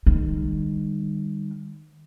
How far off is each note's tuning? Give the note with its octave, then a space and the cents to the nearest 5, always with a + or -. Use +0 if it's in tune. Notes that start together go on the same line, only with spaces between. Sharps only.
D#3 -25 G3 +30